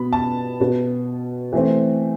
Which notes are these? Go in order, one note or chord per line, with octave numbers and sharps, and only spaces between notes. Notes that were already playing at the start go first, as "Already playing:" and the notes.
Already playing: B2 B3 B5
A5
B2 B3
E3 A3 C4